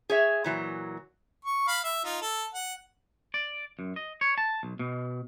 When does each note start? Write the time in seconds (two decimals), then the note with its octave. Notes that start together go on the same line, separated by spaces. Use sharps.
0.10 G#4 C#5 E5
0.44 A#2 E3 F#3
1.45 C#6
1.68 F5 B5
1.84 E5
2.04 D#4 F4
2.22 A4
2.54 F#5
3.34 D5
3.79 F#2
3.96 D#5
4.21 C#5
4.38 A5
4.63 B1
4.79 B2